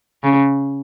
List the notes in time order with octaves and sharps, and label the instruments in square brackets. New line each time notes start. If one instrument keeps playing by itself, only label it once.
[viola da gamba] C#3